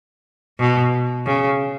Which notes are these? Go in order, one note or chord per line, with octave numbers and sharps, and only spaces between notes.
B2
C#3